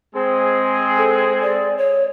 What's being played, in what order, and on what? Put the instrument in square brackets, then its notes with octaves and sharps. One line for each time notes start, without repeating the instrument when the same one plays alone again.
[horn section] G#3 C4 G#4
[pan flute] A4
D5
C#5